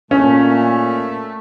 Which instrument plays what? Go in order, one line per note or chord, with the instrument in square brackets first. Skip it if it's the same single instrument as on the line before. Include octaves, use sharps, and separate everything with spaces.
[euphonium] A#2 [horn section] A3 [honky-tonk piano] C#4